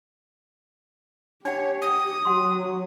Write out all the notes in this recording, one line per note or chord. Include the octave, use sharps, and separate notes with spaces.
D4 G4 C#5 F#5
D#6
F#3 F#5 C6